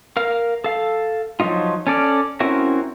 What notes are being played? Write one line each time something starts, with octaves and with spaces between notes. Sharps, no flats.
A#4 F5 F6
A4 F5
F3 F#3 A#3 D#4 F4
C#4 A4 D5 F6
C4 C#4 E4 F#4 A#4